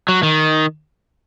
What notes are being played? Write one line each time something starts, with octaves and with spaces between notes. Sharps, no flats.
F#3
D#3